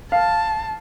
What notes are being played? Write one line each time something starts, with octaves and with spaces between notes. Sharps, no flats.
F5 A5